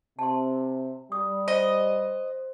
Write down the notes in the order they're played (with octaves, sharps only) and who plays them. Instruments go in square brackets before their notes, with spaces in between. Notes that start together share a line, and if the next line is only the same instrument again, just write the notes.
[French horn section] C3 [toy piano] A5 C6
[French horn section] G3 [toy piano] D#6
[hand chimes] C5 [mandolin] D#5